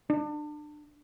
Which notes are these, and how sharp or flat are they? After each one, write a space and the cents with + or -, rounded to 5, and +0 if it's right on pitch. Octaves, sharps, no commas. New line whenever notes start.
D4 +30